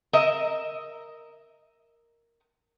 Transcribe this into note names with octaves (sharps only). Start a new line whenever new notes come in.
A#4 D#5 E5